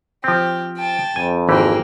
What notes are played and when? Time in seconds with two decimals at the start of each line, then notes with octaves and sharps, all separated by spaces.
0.24 F3 C4 G4
0.77 G5 A5
1.16 F2 G#5
1.49 G#1 E3 A#3 G4 G5